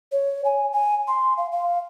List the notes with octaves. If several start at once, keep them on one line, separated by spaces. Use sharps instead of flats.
C#5
G#5
G#5
C6
F5
F5